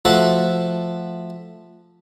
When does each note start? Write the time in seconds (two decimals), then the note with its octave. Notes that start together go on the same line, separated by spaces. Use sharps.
0.05 F3 A3 F#4 A4